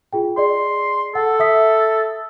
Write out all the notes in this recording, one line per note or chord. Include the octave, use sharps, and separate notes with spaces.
F4 G#4 G5
G#4 D5 D#5 C6
A4 F#5
E5 D#6 B6